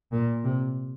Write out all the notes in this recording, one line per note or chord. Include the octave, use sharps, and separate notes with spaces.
A#2
C3